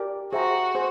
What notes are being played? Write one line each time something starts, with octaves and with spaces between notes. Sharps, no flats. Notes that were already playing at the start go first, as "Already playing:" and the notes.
Already playing: G4 A#4 D5
F#4 G#4 C5 E5 G5 A#5
G#4 C5